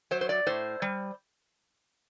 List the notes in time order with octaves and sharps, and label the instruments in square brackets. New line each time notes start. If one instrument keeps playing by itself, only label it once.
[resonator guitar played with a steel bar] F#3 C5
C5
D5
A2 C5
G3